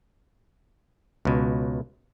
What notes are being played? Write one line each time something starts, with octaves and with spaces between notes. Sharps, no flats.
C#2 B2